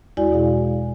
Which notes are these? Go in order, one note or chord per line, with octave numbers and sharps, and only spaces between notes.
E2 G#3 E4 F#4 D5 G#5
B2 G#4 F5